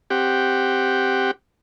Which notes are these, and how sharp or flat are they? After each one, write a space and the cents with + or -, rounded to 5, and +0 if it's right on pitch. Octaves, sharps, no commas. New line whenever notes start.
C4 +0 G4 +0 F#5 +0